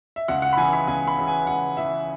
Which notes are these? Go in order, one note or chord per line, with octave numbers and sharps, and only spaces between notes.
E5
C#2 F#5
F#5
B5
C#3 E3 G#5
B5
C#2 G#5
B5
C#3 E3
G#5
C#2 F#5
C#3 E3 E5